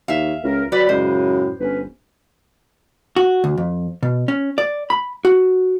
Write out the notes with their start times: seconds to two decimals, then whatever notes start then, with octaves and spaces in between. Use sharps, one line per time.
0.08 D#2 E5 F5
0.44 C#2 A#4
0.72 F#3 B4 D5 B5
0.89 F#2 A2 C#3 G#3 C5
1.60 G1 C#4 B4
3.16 F#4
3.44 D2
3.58 F2
4.03 B2
4.28 C#4
4.58 D5
4.90 B5
5.25 F#4